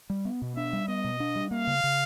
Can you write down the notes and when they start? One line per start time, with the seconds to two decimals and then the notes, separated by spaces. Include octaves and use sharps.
0.10 G3
0.25 B3
0.42 B2
0.57 D4 E5
0.73 G3
0.88 B3 D#5
1.04 B2
1.20 D4
1.36 G3
1.51 A#3 F5
1.67 C#3
1.84 C#3